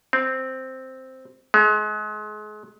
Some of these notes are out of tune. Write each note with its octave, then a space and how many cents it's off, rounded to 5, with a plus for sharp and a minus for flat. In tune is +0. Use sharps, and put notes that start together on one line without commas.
C4 +0
G#3 +35